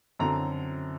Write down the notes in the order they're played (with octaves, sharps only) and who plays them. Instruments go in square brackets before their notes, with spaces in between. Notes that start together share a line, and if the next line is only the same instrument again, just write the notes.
[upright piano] F#2 D3 F#3 C4 A#5